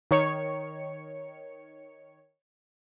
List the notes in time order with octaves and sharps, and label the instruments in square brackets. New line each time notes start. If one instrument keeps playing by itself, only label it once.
[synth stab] D#3 C#5 C#7